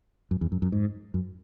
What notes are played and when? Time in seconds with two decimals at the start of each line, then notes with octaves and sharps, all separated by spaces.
0.31 F#2
0.41 E2
0.52 F#2
0.62 F#2
0.72 G#2
1.14 F#2